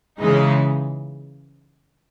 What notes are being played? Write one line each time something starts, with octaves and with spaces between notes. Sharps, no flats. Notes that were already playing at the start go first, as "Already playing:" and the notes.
C#3 E3 G#3 D#4